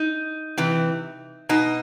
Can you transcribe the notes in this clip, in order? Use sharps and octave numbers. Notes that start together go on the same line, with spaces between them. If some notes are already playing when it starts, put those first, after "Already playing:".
Already playing: D#4
C3 E3
B2 D#4